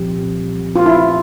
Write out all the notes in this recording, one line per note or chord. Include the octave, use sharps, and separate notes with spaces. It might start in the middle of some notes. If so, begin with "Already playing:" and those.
Already playing: C2 A#2 F3 C4 G4
F4
E4